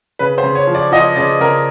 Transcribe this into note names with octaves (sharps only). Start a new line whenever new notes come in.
C#3 B4
C5
C#3
C#5
F3
D5
F3 D#5
C#3 D5
C#3 A#4